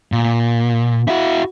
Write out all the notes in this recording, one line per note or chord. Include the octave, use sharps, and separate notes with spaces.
A#2
E4 F#4